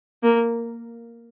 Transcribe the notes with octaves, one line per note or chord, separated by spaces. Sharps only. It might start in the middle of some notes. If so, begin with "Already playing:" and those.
A#3